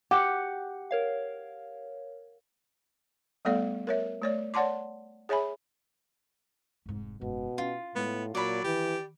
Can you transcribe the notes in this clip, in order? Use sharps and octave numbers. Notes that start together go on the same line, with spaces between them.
G4 F#5 D6
A#4 C#5 F5
G3 A3 B3 A4 D5 F5
A#4 C#5 E5
A3 C#5 D5
C#5 D5 F#5 A5 C6 D6
G#4 C#5 E5 G#5 B5
F1 G#2
F#1 G#2 B2
C#4 E4 F4
A2 G#3 B3
A#2 F#3 D5 B5
D#3 E3 G4